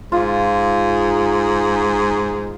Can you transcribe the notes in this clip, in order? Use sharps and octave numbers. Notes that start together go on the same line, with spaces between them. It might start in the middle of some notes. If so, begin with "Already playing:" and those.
G#2 F4